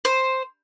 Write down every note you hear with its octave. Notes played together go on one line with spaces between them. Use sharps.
C5